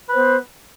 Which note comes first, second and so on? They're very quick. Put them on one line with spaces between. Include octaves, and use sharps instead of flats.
B4 C5 B3